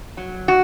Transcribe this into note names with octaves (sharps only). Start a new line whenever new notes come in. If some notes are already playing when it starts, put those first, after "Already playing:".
F#3
F#4